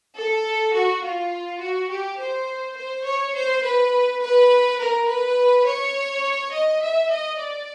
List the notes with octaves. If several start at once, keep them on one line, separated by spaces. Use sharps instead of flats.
A4
F#4
F4
F#4
G4
C5
C5
C#5
C5
B4
B4
A#4
B4
C#5
D#5
E5
D#5
D5